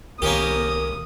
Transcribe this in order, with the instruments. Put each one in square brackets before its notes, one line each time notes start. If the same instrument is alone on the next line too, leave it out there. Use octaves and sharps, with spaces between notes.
[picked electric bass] C2 D#3 [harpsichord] A#3 C#4 G4 [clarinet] A#4 [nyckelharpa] D#6